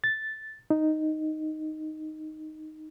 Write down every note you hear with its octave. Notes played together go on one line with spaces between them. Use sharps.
A6
D#4